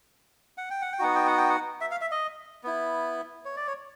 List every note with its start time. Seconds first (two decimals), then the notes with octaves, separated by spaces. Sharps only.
0.58 F#5
0.70 G5
0.82 F#5
0.93 G5
0.99 B3 D#4 F#4 F#5
1.15 G5
1.27 F#5
1.38 G5
1.50 F#5
1.81 E5
1.91 F5
2.01 E5
2.12 D#5
2.64 B3 E4
3.45 C#5
3.56 D5
3.67 C#5